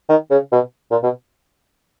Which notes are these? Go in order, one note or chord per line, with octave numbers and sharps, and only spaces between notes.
D#3
C#3
B2
A#2
B2